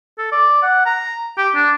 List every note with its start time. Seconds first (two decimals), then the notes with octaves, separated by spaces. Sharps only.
0.18 A4
0.32 D5
0.63 F#5
0.86 A#5
1.37 G4
1.55 D4